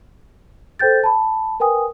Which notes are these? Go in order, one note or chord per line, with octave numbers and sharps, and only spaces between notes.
A4 C5 G5 G6 A6
A5 B5
A#4 B4 G5 G#5 D#6